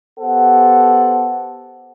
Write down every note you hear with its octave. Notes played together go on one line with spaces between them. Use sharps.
B3 G4 A4 C5 F#5